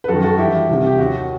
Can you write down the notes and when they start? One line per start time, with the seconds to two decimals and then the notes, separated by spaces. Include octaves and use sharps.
0.04 B4
0.08 F#2 D#3 F#4 A4
0.23 F#4 A4
0.38 G2 E3 E4 G4
0.69 C2 C3 D#3
0.87 G4
0.98 D#2 F#4
1.03 D#3